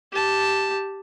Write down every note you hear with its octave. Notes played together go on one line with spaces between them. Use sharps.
G4 A5